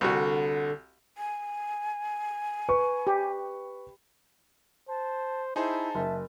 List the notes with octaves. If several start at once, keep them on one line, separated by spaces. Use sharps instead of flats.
C2 D3 F#4
G#5
B4 C#6
G4
C5 A5
D#4 E4 G#4 C5 A5
F#1 E5